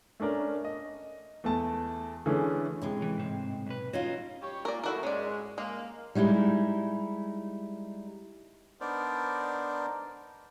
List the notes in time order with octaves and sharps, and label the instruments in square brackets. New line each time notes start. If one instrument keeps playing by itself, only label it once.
[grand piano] A3 C#4 D4 A#4
D#5
E2 A3 A5
D3 E3 A3 C#4 G#4
[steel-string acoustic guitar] A2 C3 G#3
[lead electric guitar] E3
G#2 C4
B1 B4
[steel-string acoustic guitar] C#4 D#4 F4 [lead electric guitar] F#4 D#5
[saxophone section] G3 G4 C#5
[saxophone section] A#2 A#3 [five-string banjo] A#4 D5
[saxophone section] D#2 A3 [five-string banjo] E4 F#4 A#4
[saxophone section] G#2 G#3 [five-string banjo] C#4 D5
[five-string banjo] G#3 [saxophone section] A#3
[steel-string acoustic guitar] G3 G#3 D#4 E4
[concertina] B3 D4 D#4 A#4 C5 D5